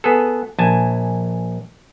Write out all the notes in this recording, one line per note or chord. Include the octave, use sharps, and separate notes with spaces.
B3 G#4 A4
A#1 G#5 A5